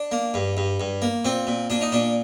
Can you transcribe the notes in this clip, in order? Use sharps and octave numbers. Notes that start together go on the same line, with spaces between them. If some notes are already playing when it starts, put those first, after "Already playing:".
Already playing: D4
A#3
G2
G2
G2
A#3
A#2 C4
A#2
A#2 D4
D#4
A#2 D4